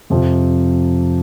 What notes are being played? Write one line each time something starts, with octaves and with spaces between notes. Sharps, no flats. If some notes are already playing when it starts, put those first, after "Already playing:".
F2 C3 F3